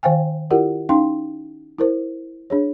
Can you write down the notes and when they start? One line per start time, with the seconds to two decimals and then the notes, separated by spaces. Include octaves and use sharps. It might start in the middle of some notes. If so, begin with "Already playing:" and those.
0.03 D#3 C5 F5 G5 G#5
0.51 E4 F4 G4 A#4 D5 F#5
0.89 C#4 D#4 F5 G5 C6
1.79 E4 A#4 C5
2.50 D4 G#4 C#5